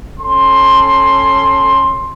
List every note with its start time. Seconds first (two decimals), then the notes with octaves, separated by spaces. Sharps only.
0.19 C#4 A4 C6